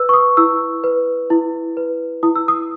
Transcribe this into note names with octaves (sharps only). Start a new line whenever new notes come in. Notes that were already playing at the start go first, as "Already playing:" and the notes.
Already playing: B4 E6
C#6
D#6
E4 E6
B4
E4
B4
E4 D#6
E6
D#6